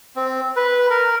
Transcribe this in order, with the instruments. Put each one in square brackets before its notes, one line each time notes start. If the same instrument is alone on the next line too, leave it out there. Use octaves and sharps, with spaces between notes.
[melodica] C4
B4
A#4